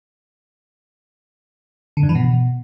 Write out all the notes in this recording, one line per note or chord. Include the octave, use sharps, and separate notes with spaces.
D3
G2
E3
B2